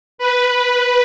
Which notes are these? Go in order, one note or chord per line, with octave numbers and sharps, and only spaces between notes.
B4